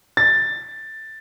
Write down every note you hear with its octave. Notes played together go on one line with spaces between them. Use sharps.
A6